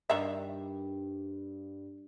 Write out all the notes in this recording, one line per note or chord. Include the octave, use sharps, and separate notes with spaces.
G2 D#3 D4 E5